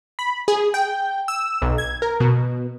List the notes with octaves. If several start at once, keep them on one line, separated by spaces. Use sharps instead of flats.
B5
G#4
G5
E6
B1
G#6
A#4
B2